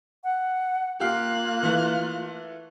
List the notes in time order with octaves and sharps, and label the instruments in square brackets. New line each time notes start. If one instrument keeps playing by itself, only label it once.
[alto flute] F#5
[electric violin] A#3 F#6 [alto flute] F4 [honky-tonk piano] G4 F5
[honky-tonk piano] E3 A3